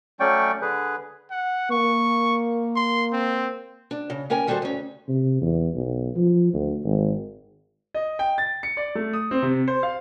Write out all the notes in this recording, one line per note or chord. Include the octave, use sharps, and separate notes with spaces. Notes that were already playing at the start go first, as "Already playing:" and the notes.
F#3 A3 C#4 D5 G5 C#6
D3 G#4 B4
F#5
A#3 C#6
C6
C4
D4
C#3
A#3 C#4 A#4 G5 G#5
D#3 G3 F#4 A4 C5
D2 C#4
C3
E2
B1
F3
D2
G#1
D#5
G5
A6
C#7
D5
A3
D#6
C4
C3
C5
F5